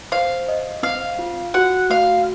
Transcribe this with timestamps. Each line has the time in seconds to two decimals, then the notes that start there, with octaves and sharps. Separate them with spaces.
0.12 C5 F5
0.48 D#5
0.83 C4 F5
1.19 F4
1.54 F#4 F#5
1.90 A3 F5